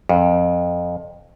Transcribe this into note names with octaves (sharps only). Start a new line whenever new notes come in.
F2